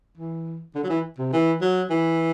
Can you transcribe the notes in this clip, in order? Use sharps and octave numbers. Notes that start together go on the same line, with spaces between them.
E3
D3
F#3
E3
C3
E3
F#3
E3